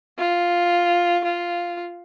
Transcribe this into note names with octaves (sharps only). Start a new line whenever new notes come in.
F4
F4